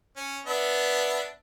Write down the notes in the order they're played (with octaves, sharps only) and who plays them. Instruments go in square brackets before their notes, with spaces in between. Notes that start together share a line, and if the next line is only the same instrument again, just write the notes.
[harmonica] C#4
B3 D4 E5